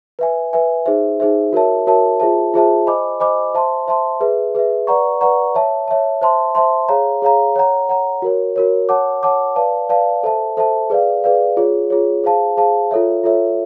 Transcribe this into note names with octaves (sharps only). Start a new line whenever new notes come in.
B4 E5 G#5
B4 E5 G#5
D#4 G#4 C5 E5
D#4 G#4 C5 E5
F#4 A#4 C#5 E5 A5
F#4 A#4 C#5 E5 A5
F4 G#4 C5 E5 A5
F4 G#4 C5 E5 A5
C5 D#5 G#5 B5 D6
C5 D#5 G#5 B5 D6
C5 E5 A5 C6
C5 E5 A5 C6
G#4 B4 E5
G#4 B4 E5
B4 D5 F#5 A#5 C#6
B4 D5 F#5 A#5 C#6
C#5 E5 A5
C#5 E5 A5
C5 E5 A5 C6
C5 E5 A5 C6
G#4 C#5 F5 A#5
G#4 C#5 F5 A#5
C#5 F#5 A#5
C#5 F#5 A#5
F#4 A#4 C#5
F#4 A#4 C#5
C#5 F#5 A5 D6
C#5 F#5 A5 D6
B4 D5 F5 A5
B4 D5 F5 A5
A4 C5 E5 A5
A4 C5 E5 A5
G#4 B4 D5 F5
G#4 B4 D5 F5
F4 G#4 C#5
F4 G#4 C#5
G#4 C5 F5 A5
G#4 C5 F5 A5
F4 A4 C#5 E5
F4 A4 C#5 E5